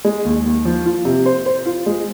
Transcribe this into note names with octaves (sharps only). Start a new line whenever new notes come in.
G#3
D#2
D#2
F3
F4
C3
C5
C5
F4
G#3